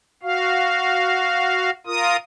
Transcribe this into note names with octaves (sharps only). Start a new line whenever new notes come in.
F#4 F5
F4 A#4 D#6